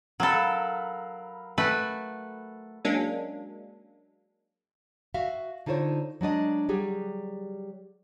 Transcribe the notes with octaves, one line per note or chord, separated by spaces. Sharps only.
F#3 A4 A#4 F5 B5
A3 F#4 B4
F#3 G#3 A#3 C#4 D4
F#4 E5 F5
D3 D#4 F4 C5 C#5
F#3 G#3 D4 D#5
F#3 G3 G4 G#4